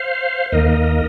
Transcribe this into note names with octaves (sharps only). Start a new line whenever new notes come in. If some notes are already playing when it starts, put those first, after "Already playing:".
Already playing: C5 F5
D#2 D#3 A#3 A#4 D#5